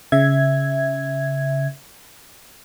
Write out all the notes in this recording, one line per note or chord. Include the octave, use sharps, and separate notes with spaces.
C#3 E5 G#6